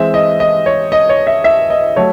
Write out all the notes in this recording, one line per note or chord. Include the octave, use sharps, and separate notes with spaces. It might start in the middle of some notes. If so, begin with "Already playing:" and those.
Already playing: E3 G#3 C4 E5
D#5
D#5
C#5
D#5
C#5
E5
E5
D#5
F#3 A3 C#5